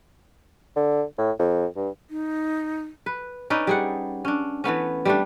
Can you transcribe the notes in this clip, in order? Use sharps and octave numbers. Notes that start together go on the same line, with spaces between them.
D3
A2
F2
G2
D#4
B4
C#4 D#4 B4 D5
G3 G#4 F#5
C#4 D4
E3 A3 B3 C#4
G3 A3 D4